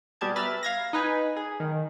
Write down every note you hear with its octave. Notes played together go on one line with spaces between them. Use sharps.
B2 G3 G4 G#4 A5 G#6
B4 E5 A#5 B5 F6 A6
F5 G#6 A#6
D#4 B4 G#5
G#4
D#3